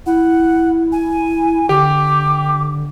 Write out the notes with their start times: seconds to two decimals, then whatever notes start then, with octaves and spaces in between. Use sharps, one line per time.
0.06 E4 F#5
0.92 G#5
1.69 D3 G4 D6